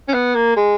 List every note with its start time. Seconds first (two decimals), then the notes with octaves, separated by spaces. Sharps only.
0.08 C#4
0.14 B3
0.35 A#3
0.56 G#3